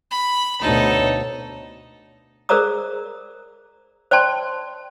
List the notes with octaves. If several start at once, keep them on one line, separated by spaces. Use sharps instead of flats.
B5
D2 B2 A3 D4 D#4 A4 C#5
G#4 A#4 C5 D5 A#5 D#6
C5 D5 G5 A5 C6